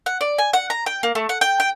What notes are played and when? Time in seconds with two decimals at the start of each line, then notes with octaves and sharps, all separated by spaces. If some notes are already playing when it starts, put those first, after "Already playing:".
0.06 F#5
0.21 D5
0.38 G#5
0.53 F#5
0.70 A#5
0.86 G5
1.03 A#3
1.15 A3
1.29 F#5
1.41 G5
1.60 G5